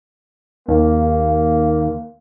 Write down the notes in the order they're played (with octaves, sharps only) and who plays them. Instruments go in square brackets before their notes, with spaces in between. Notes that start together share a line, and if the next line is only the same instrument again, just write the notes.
[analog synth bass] D#2 [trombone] A#3